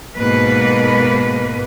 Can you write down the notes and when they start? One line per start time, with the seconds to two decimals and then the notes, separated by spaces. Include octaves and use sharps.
0.17 G#2 B2 A#3 B4